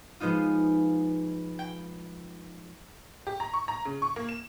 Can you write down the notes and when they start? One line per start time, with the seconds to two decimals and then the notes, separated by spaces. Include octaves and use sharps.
0.20 F3 G#3 B3 D#4 F4
1.59 G5
3.27 G4
3.40 A#5
3.53 C#6
3.68 A#5
3.85 C#3
4.02 C#6
4.16 A#3
4.29 E7